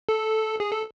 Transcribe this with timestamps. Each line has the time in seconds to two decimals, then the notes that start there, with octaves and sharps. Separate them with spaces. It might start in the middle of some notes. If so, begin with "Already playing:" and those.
0.09 A4
0.60 G#4
0.71 A4